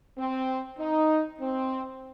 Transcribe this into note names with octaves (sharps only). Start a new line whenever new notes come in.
C4
D#4
C4